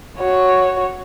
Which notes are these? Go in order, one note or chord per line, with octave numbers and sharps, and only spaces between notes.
F#4 C#5